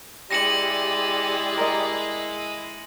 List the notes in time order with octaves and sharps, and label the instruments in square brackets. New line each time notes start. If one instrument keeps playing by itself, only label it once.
[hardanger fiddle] G#3 E4 [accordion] G4 D5 [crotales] A#6 C#7 F#7
[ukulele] A#4 D#5